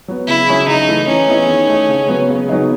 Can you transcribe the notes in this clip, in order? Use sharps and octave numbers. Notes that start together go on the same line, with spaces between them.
F#3 B3
C#3 E4
F#3 C#4 G#4 C#5
C#3 D#4
E3 A3
E3 C#4
B3 E4 G#4 D#5
D#3
A3 D#4 G#4
C#3
F#3 B3
C#3
F#3 B3 D#4 G#4